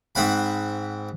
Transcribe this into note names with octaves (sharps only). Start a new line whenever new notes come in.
G#2 C4 F#5 B5